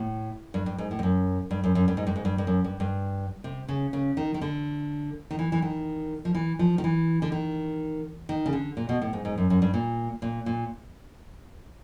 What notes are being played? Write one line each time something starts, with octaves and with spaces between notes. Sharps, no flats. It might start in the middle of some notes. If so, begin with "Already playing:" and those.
Already playing: A2
G2
G2
G#2
A2
G2
F#2
G2
F#2
F#2
G2
G#2
G2
G#2
G2
G2
F#2
G2
G2
C3
C#3
C#3
D#3
D#3
D3
D#3
E3
E3
D#3
F3
E3
F3
D#3
E3
D3
D#3
D#3
C#3
D3
A#2
B2
A2
G#2
G#2
F#2
F#2
G2
A#2
A#2
A#2